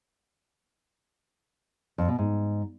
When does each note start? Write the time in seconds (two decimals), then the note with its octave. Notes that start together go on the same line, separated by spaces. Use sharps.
1.98 F2
2.08 B2
2.18 G#2